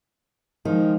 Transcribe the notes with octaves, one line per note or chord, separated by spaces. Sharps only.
D#3 F3 G#3